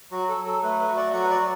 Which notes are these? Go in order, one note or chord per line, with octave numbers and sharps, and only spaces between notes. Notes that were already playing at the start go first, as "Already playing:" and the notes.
F#3 F#4
A4
F#3
A4
A3 B4
B4
F#4
D5
F#3 F#5
B4
D5
F#3